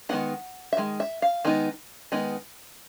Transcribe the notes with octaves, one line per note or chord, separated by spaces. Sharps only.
D#3 G#3 B3 D#4 F#5
E5
D#3 G#3
E5
F5
D#3 G#3 B3 D#4
D#3 G#3 B3 D#4